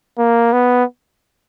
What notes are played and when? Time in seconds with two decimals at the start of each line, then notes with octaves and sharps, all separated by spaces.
0.18 A#3
0.53 B3